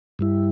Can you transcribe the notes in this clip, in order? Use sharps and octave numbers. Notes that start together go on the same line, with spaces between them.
G2 G3 E4